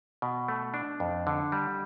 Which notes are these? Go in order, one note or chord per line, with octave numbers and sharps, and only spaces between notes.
B2
A3
D4
F2
D3
G3